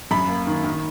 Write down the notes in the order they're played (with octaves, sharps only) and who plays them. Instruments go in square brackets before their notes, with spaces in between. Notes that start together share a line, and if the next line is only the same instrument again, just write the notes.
[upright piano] F#2 [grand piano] B5
[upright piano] A#3
D#3
D#3